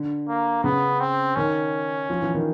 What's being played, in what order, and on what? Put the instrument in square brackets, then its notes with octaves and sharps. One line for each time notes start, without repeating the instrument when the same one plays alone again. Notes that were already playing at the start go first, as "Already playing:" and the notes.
Already playing: [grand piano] D3
[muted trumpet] A#3
[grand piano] C#3 [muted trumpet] B3
[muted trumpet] C4
[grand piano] D#3 [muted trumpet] C#4
[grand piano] F3
E3
D#3